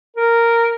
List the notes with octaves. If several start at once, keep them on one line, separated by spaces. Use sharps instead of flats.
A#4